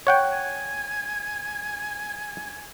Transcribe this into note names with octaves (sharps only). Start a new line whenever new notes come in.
C#5 F#5 G5
G#5